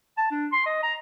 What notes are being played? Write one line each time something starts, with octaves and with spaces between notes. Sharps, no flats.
A5
D4
C6
D#5
A#5